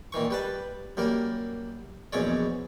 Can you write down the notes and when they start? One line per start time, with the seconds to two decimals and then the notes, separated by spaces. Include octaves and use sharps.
0.12 A#2 D#3 E3 C#6
0.31 G3 B4 A5
0.97 F#2 G3 A#3 A#4
2.13 A#1 E2 B2 C#4 C#5 D5